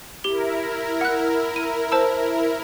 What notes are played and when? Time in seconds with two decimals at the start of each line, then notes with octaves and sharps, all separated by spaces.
0.24 E4 G4 A#4 G7
1.01 F#5 F#6
1.56 D#7
1.92 C5 A5 E6